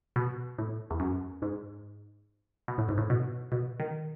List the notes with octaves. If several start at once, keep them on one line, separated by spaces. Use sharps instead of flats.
B2
A2
E2
F#2
G#2
B2
A2
G#2
A2
B2
B2
D#3